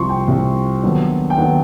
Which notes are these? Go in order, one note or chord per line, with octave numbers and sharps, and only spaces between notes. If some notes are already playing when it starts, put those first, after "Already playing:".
Already playing: C2 C3 F3 C6 C#6
G5
C2 C3 F3
D#2 D3 F#3 B3
G5
D#2 D3 F#3 B3 F#5